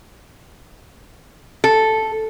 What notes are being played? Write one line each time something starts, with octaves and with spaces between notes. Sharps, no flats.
A4